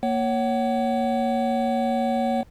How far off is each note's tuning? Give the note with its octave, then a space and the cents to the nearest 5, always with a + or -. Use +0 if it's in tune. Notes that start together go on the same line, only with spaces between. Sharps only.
A#3 +0 C#5 +0 F#5 +35